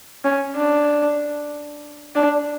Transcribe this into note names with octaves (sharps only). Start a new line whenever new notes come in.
C#4
D4
D4